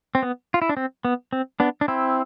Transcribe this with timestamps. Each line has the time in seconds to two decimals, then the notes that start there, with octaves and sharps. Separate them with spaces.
0.15 C4
0.23 B3
0.54 F4
0.62 E4
0.69 D4
0.77 C4
1.05 B3
1.33 C4
1.60 B3 D4
1.81 D4
1.88 C4 E4